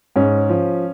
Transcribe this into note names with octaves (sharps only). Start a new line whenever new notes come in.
G#2 C#4
F3